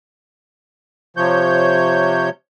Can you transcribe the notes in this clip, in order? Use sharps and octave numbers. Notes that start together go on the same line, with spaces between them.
C3 F3 C#5 G6